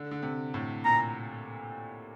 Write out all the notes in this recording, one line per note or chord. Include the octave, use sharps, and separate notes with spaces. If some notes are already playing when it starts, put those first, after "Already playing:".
Already playing: D3
D3
C3
A2
A#2 A#5